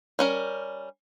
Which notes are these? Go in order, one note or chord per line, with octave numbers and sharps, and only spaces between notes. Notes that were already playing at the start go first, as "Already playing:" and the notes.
G3 C#4 A#4